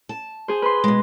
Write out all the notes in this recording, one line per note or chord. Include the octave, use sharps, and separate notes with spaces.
A5
G#4 C5
B4 C6
B2 G#3